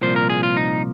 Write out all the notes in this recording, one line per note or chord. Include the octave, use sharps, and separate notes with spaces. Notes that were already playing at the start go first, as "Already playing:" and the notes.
C2 A#2 F3 C5
A#4
G#4
F4
D#4